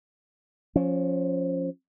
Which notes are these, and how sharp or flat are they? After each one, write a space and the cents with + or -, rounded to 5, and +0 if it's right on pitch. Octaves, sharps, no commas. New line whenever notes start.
F3 +20 C#4 +0